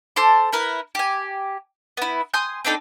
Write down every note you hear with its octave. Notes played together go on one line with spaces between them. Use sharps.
A4 C5 C6 D6
E4 A#4 B4
G4 G#5
B3 E4
G#5 C6 D#6 G6
C4 D4 D#4 A4